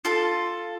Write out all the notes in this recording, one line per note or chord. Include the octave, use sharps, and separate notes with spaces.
F4 A4